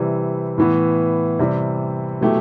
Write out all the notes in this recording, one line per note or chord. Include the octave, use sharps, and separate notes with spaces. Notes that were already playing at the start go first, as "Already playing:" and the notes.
Already playing: C3 E3 G3
A2 E3 B3
C3 E3 G3
B2 F#3 A3 E4 G4